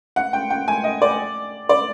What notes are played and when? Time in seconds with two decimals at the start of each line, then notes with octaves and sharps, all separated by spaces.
0.16 F#5
0.33 G5
0.50 G5
0.68 G#5
0.84 D#5
1.02 D5
1.69 D5